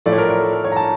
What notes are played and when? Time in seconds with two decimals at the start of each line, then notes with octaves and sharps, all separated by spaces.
0.06 A2 F3 A3 D5
0.12 C#5
0.18 A#4
0.30 A#4
0.41 A4
0.53 A#4
0.65 C#5
0.72 A#5
0.76 A5